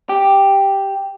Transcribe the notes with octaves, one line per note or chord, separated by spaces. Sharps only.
G4